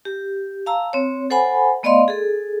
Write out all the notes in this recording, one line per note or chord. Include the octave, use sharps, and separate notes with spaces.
G4
F5 A5 A#5 E6
C4 C#5
A4 C5 F#5 G#5 B5
A3 B3 D5 D#5 F5 C6
G#4 A4